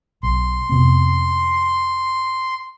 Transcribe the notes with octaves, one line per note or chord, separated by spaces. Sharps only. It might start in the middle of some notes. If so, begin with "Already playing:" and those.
B1 C6
F2 C3 B3